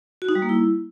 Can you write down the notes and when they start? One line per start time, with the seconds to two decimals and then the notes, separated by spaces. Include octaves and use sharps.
0.22 F#4
0.29 D#4
0.35 G3
0.42 A#3
0.49 E4